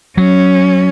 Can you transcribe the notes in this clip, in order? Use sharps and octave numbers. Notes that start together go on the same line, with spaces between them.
F#3 C#4